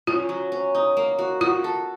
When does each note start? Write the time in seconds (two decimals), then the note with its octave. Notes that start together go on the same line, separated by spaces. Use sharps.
0.07 C#4 F4
0.29 F#3
0.52 C#4
0.75 D#4
0.97 A#3
1.19 F#4
1.41 F4 F#4
1.64 A4